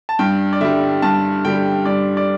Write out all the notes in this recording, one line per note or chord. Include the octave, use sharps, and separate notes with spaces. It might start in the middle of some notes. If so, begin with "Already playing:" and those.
A5
G2 G5
D5
D3 G3 E5
G2 A5
D3 G3 G5
G2 D5
D5